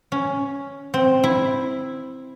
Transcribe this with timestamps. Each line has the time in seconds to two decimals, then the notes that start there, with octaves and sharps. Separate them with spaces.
0.12 C#4
0.94 C4
1.24 E4